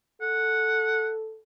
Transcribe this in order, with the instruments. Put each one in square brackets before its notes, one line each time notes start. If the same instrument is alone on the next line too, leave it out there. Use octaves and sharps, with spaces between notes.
[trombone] A4 [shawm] F#5